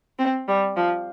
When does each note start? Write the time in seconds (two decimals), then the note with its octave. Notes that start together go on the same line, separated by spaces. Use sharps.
0.19 C4
0.48 G3
0.76 F3